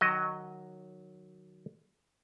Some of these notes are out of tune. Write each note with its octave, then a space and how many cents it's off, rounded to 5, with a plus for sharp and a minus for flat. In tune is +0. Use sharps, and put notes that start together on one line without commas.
D#3 -25 F#3 +0 D#5 +0